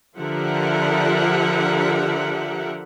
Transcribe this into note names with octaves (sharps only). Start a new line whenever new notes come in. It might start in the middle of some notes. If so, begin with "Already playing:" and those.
D3 F3 G4 A#4 E5 F#5